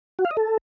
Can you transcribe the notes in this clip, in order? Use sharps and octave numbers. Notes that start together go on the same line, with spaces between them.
F#4
F5
D#5
A4